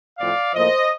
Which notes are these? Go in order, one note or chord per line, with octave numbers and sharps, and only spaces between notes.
A2 F3 C4 D5 F5
A2 F3 A#3 C5 D#5